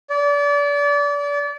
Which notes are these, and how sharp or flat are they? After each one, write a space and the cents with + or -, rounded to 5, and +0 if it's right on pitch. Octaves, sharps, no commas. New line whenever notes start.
D5 -30